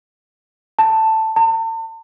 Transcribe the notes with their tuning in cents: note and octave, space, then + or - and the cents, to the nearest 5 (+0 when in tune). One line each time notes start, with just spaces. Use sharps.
A5 +10
A5 +40